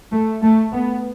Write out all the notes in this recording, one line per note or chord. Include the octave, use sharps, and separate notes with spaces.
A3
A3
B3